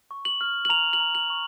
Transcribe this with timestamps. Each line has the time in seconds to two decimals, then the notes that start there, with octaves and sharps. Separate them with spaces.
0.11 C#6
0.25 F#7
0.41 F6
0.65 F#7
0.70 A#5 F7
0.93 F#7
1.00 A#5
1.15 F#7
1.30 C#6